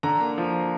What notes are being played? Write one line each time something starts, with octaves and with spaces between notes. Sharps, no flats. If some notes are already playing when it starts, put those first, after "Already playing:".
D3 A#5
A#3
F3